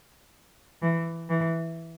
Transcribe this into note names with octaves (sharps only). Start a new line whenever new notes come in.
E3
E3